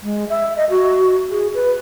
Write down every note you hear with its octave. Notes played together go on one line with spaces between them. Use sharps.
G#3
E5
D#5
F#4
G#4
B4